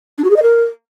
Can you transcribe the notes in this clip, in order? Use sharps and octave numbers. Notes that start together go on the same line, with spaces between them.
D4
F#4
G#4
D#5
A#4